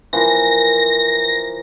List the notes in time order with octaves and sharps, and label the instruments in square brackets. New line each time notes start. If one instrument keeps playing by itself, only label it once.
[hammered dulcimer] E3 F3 A#3 [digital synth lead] A#6